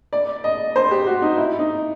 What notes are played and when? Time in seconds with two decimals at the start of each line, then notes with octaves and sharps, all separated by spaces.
0.13 D5
0.44 D#5
0.76 C5
0.91 G4
1.06 F#4
1.22 D#4
1.38 E4
1.59 D#4